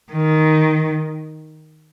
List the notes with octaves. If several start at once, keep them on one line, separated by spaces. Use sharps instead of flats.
D#3